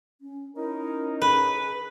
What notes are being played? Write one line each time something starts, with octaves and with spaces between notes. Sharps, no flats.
C#4
C#4 D#4 E4 A#4
G#4 B4